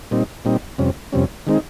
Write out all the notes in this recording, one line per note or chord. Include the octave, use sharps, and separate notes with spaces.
A#2 G3 C4 D#4
A#2 G3 C4 D#4
F2 C3 G3 C#4
F2 C3 G3 C#4
D#3 G#3 C4 D#4